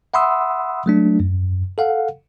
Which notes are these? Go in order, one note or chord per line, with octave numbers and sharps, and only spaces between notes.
E5 F#5 B5 C6 D#6 E6
F#3 A3 D4
F#2
A4 F5 F#5